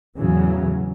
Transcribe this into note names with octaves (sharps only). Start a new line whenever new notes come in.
E2 A2 C#3 E3 F#3